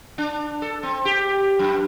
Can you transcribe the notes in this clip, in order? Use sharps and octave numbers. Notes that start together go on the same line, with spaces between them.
D4
A4
C4
G4
F#2